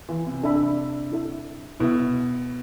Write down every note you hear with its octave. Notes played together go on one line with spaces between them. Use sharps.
E3
C3
D4 A4 E5 B5
E4 A4 E5
B2 E4 A4 E5